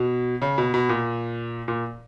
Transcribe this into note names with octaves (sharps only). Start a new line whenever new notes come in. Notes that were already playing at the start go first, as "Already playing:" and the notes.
Already playing: B2
C#3
B2
B2
A#2
A#2